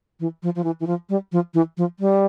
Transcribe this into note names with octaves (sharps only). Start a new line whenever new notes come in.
E3
F3
F3
E3
E3
F3
G3
F3
E3
F3
G3